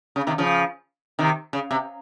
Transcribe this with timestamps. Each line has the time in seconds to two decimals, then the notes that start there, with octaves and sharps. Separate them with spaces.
0.16 C#3
0.27 C3 D#3
0.38 C#3 F3
1.19 C3 D#3
1.53 C#3
1.71 C3